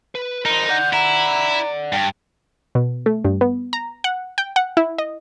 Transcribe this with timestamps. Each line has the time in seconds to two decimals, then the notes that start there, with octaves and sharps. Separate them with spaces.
0.15 B4
0.45 D#4 A#4 C5
0.69 D5 F#5 G6
0.93 E4 A#5
1.93 G2 G5
2.75 B2
3.06 A3
3.25 G2
3.41 B3
3.73 A#5
4.04 F#5
4.38 G5
4.56 F#5
4.77 E4
4.98 D#5